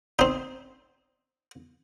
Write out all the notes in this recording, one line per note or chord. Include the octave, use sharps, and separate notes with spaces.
C4 D#4